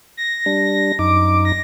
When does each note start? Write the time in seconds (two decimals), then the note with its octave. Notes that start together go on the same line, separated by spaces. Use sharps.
0.17 A#6
0.46 G3 D4
0.99 F#2 D#4 D6
1.45 A#6